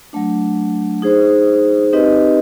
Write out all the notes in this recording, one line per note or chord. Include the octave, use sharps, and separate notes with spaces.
F#3 A3 D4
D#4 G#4 C5
C4 D#4 G4 B4 D#5